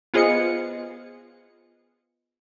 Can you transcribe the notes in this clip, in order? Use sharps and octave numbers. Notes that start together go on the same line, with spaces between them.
B3 F4 G#4 C5 D#5 C#7